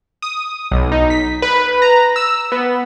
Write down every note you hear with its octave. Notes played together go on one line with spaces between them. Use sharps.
D#6
B1
D#4
B6
B4
A#5
E6
B3